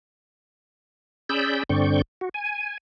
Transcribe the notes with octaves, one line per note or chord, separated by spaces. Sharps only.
C#4 G#4 D5 B5 E6 G6
G2 D3 C4 D5 C#6 G6
F#4
G#5